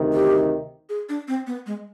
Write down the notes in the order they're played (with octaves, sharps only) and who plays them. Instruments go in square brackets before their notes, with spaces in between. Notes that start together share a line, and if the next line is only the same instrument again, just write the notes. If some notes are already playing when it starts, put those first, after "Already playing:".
Already playing: [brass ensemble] D2 C3 D#3
[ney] G4
G#4
D4
C4
B3
G#3